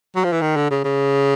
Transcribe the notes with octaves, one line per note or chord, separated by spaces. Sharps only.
F#3
F3
E3
D#3
D3
C#3
C#3